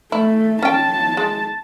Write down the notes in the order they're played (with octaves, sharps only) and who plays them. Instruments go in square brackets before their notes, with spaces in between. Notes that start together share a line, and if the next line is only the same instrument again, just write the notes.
[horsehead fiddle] A3 [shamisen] E4
[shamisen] C#4 G5 [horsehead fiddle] A5
[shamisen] G#3